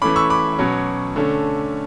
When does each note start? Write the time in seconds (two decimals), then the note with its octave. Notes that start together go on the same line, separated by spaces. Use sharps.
0.02 E3 A3 C#4 B5 D6
0.16 C#6 E6
0.30 B5 D6
0.59 B2 F#3 C#4
1.16 D3 A3 C#4